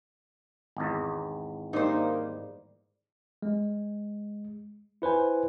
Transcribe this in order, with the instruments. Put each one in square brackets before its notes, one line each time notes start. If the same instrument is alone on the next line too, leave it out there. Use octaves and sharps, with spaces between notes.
[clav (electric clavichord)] G#1 E2
[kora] G#2 G3 [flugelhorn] A#3 [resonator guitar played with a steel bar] D#4 C5
[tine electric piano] G#3
E4 B4 C5 G#5